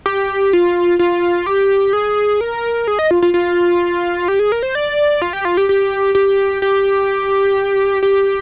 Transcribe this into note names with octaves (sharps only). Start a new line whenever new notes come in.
G4
F4
F4
G4
G#4
A#4
G#4
D#5
F4
F4
F4
G4
G#4
A#4
C5
D5
F4
G4
F4
G4
G4
G4
G4
G4